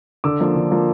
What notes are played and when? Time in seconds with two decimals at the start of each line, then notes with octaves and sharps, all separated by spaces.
0.24 D3 D6 E6
0.40 F3 A#3
0.56 D3
0.71 F3 A#3